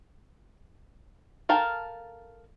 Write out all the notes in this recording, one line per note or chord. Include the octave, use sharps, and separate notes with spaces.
A4 A#4 F5 G5 A5